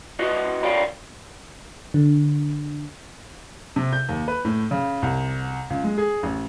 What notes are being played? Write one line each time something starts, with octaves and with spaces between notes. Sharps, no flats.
F#4 B4 D#5 E5
A#4 C#5 D5 F5 G5 B5
D3
C3
G6
D#2
B4
A2
C#3
C2
C#2
G#3
G#4
A1